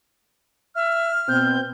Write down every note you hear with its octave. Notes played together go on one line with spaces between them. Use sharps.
E5 F6
B2 C4 G6